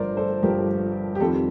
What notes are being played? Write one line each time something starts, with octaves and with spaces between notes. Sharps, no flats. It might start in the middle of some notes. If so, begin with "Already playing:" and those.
Already playing: G1 G2 F3 A#4 C5 D5
A4 C5
G1 G2 F3 G4 A#4
G4
F2 D#3 G3 C4 A4